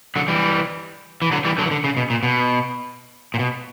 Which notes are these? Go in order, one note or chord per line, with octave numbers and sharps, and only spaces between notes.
D3 F#3
E3 G3
E3
D3 F#3
E3 G3
D3 F#3
E3
D3
C#3
B2
A#2
B2
A#2
B2